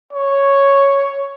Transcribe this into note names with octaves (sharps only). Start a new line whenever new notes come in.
C#5